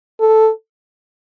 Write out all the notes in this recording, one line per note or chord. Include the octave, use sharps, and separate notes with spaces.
A4